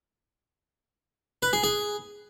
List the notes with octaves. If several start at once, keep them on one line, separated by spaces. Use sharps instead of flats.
B4
G#4
G#4